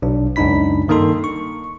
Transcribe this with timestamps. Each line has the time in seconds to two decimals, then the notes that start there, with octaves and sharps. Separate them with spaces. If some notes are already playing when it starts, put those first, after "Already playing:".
0.02 B1 D4
0.36 C#2 F#2 D4 D#4 B5 B6
0.88 G2 D#3 A#3 D#4 A4 C6
1.24 C#6